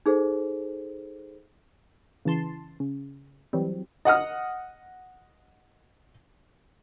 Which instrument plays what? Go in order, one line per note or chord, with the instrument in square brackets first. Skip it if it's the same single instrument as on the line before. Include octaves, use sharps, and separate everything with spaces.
[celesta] D#4 G#4 A4 C5
[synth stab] C#3 E3 A5 C6
C#3
E3 F#3 G3 C4
[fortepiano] D#5 F#5 D#6 F6